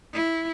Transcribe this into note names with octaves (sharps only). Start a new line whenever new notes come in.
E4